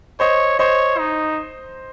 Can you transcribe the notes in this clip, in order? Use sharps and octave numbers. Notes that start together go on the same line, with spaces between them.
C5 C#5 D#5
C5 C#5 D#5
D#4